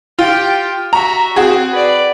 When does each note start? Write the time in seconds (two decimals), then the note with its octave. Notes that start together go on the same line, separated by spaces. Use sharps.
0.19 F4 G4 G5
0.93 F#4 E5 A#5
1.36 C4 F#4 G#4
1.72 B4 D5